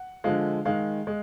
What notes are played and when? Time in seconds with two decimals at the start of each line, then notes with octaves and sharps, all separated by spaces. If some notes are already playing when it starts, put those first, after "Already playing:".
Already playing: F#5
0.24 D3 F3 G#3 F5
0.65 D#3 G#3 F5
1.07 G#3